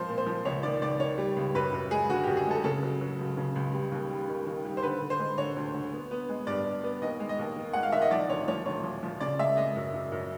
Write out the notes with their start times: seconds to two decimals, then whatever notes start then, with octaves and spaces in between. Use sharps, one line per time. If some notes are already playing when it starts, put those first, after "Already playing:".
Already playing: F3 G#3 C4 C5
0.09 A#2
0.18 C5
0.26 F3
0.45 C#2 C#5
0.63 D#3 D5
0.81 C#2 D5
1.00 D#3 C#5
1.18 G3
1.36 C#2
1.54 F#2 B4
1.73 F#2
1.91 G#3 G#4
2.09 D3 F#4
2.23 F#2 G4
2.37 G#4
2.46 G#3 A4
2.64 C#3 A4
2.83 F#3
3.01 F#3
3.19 C#2
3.37 C#3
3.55 C#2
3.73 G3
3.92 D#2
4.10 G3
4.28 D#3
4.46 D#3
4.65 G3
4.77 C5
4.83 D3 B4
5.01 D3
5.10 C5
5.19 G#3
5.38 D3 C#5
5.56 D2
5.74 D3
5.92 B3
6.11 B3
6.29 G#3
6.47 G2 D5
6.66 G2
6.84 B3
7.02 D#2 D#5
7.20 G#3
7.29 D#5
7.39 D#2
7.56 D#3
7.73 G#3 F#5
7.83 F5
7.92 D#3 E5
8.02 D#5
8.11 F3 D5
8.30 D2 C#5
8.48 F3 C#5
8.66 D2 C#5
8.84 F3
9.03 F3
9.20 C#3 D5
9.39 G#3 E5
9.57 G#3 D#5
9.75 F#2
9.94 F#2
10.12 F#2